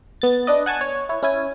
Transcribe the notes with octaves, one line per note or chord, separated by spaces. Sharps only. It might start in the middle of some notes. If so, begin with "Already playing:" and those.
B3 A6
D4 B4 D5 D#5
F#5 G#5 A5 C#6
C#5
E4 C#5
C#4 E4 G#5